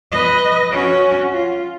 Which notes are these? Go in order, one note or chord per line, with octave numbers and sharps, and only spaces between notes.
B4 D#5
C#4 F#4
F4